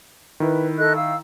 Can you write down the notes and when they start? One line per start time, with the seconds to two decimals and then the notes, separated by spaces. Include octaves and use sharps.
0.40 D#3 E4 B4
0.78 A4 D#5 F#6
0.95 F5 E6